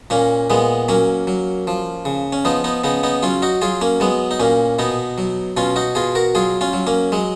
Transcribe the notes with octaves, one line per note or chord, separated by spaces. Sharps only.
A#2 A#3 C#4
A#2 G#3 B3
F#3 A#3 C#4
F#3
F3
C#3
C#4
F3 B3 D#4
B3 D#4
C#3 B3 D#4
B3 D#4
F#3 C#4 F4
D#4 F#4
F#3 F4 G#4
A#3 C#4
F#3 G#3 B3
D#4
A#2 A#3 C#4
B2 B3 D#4
F#3
B2 C#4 F4
D#4 F#4
B2 F4 G#4
F#4 A#4
F#3 F4 G#4
C#4 F4
F#3
A#3 C#4
F#3 G#3